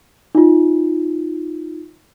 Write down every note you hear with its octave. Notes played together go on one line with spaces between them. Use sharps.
D#4 F4